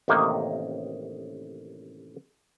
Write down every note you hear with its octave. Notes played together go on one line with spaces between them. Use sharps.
A1 A2 C3 D#3 A#3 D#4